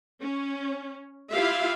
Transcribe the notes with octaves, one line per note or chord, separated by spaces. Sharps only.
C#4
E4 F4 G4 E5 F5